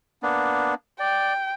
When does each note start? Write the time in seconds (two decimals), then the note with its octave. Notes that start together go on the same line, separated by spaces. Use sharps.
0.23 A#3 B3 D4
1.00 D5 G5